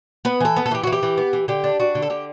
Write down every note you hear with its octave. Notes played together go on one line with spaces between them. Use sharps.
B3 B4
E3 A4
B3
A4
E3 G4
E3 F#4
G4
E3
B3
E3
D3 G4
D4
D4 F#4
D3
A4
D3 G4